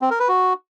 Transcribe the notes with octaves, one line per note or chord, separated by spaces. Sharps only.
C4
A#4
B4
F#4